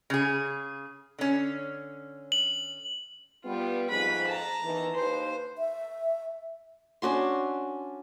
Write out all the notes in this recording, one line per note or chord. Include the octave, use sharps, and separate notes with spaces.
C#3 G#4
D3 C#4
F#7
G3 B3 F4
F2 G#2 B4 B5
A5 A#5
E2 D#3 E3
D#2 B4 C5
E5
C#4 D4 F#4 C6